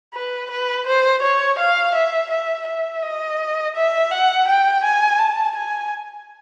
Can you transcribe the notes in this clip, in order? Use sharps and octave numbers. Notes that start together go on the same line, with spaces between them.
B4
B4
C5
C#5
F5
E5
E5
E5
D#5
E5
F#5
G5
G#5
A5
G#5